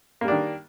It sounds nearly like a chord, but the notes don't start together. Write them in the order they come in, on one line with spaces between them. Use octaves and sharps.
A#3 G3 D4 D#3